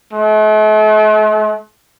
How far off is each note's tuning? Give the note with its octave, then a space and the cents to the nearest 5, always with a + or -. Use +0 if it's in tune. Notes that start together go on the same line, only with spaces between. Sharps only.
A3 -45